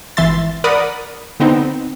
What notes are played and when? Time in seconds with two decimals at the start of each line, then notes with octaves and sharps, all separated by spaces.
0.17 G#1 E3 E5 C6 A6
0.64 A#4 D5 F#5 B5 D#6
1.40 D3 B3 C4 D#4